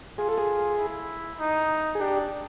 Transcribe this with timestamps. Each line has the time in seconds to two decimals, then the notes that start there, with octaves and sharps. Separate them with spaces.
0.18 F4 G#4
0.29 A4
0.38 G#4
0.78 E4
1.39 D#4
1.95 G#4
2.00 D4 G4